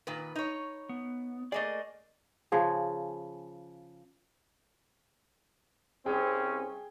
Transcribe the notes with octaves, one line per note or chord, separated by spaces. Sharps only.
A#2 D#3 B4
D#4 C#5
B3
A3 A#3 G#4 D5 D#5
C#3 F3 G#4
C2 C4 C#4 G#4 G5